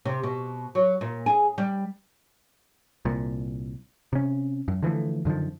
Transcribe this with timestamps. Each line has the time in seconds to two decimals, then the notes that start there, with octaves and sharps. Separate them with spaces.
0.06 C3
0.23 B2
0.75 F#3
1.01 A#2
1.26 G#4
1.58 G3
3.05 C2 A#2
4.13 C3 C#4
4.68 F#2
4.83 D3 E3 F3 A3
5.25 F#2 D3 D#3 F3